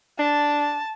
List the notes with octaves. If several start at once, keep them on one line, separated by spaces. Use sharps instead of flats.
D4 A5